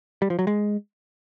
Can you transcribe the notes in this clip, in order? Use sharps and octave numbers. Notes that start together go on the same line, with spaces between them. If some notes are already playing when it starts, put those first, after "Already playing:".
G3
F3
F#3
G#3